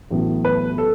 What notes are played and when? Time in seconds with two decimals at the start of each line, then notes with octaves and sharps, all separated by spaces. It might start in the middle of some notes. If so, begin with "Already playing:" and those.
0.11 A1 A2 F#3 B3
0.45 B4
0.78 A4